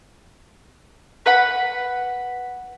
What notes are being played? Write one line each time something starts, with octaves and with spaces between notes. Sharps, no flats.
B4 F#5 B5